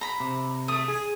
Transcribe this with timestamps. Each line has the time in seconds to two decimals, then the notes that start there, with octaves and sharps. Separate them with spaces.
0.01 A#5 B5
0.20 C3
0.68 A3 D#6
0.88 G#4